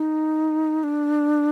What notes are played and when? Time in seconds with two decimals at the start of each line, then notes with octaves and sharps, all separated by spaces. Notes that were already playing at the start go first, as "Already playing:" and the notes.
Already playing: D#4
0.84 D4